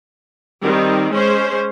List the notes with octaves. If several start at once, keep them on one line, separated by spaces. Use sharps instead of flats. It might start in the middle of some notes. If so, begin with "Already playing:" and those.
D#3 G3 C4
G#3 C#4 C5